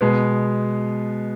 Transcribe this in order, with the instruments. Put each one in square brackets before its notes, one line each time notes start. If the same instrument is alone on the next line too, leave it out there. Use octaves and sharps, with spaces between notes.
[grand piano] B2 G#3 B3